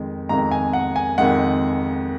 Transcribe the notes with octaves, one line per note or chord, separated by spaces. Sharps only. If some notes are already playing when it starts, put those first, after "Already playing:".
Already playing: F2 D#3 G#3
F2 D#3 G#3 A#5
G#5
F#5
G#5
F2 D#3 G#3 F#5